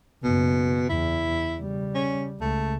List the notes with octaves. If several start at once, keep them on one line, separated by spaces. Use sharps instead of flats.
F#1 B2
E2 E4
C#3 G3
C#4
C#2 A3